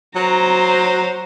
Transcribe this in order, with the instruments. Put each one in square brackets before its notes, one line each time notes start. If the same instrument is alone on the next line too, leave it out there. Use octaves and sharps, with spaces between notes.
[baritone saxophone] F#3 [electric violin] C5 A#5